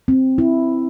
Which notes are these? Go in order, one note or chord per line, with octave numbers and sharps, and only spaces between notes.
C4
E4